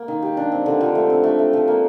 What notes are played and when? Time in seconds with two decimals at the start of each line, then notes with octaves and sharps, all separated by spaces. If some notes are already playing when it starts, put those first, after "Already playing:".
Already playing: A#3
0.08 D#3
0.22 G4
0.37 D4
0.52 C4
0.66 D3
0.81 F3
0.95 A3
1.10 C4
1.23 A3
1.39 A3
1.53 F3
1.68 A#3